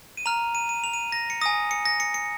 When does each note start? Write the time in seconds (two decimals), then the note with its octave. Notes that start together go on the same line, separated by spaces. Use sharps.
0.17 D#7
0.26 A#5 F6 F7
0.55 D#7
0.69 D#7
0.84 F7
0.93 D#7
1.12 A#6
1.30 C#7
1.41 G#5 D#6 A#6
1.71 C#7
1.86 A#6
2.00 C#7
2.14 C#7